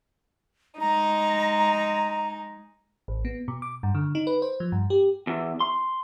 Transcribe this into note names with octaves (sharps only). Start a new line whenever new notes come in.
G#3 D#4 A#5
A1
B3
B2
D6
G2
D3
D#4
B4
C5
F3
G2
G4
E2
C6